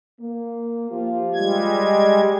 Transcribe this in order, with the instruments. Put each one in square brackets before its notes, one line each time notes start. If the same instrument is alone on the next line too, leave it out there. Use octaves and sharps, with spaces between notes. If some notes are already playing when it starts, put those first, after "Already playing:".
[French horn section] A#3
F3 F4 G4
[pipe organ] G3 G#3 G#6
[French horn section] D#5